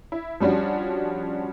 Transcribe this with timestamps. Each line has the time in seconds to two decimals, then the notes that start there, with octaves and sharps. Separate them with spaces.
0.12 E4
0.40 F3 G3 C#4 D4 F#4